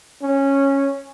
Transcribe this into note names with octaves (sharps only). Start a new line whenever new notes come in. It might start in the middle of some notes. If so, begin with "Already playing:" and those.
C#4